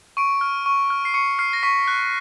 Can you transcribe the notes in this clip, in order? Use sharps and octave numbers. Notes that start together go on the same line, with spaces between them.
C#6 D7
F6
C#6
F6
C7
C#6 C#7
F6 C7
A#6
C#6 B6
F#6